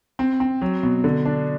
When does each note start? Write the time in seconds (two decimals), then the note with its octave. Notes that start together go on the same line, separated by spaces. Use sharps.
0.19 C4
0.40 C4
0.62 F#3
0.83 B2
1.04 D3
1.25 D4